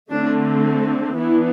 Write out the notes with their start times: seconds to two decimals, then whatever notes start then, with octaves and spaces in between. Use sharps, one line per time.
0.10 D3 A3 C4 D4
1.17 E3 B3 D4 E4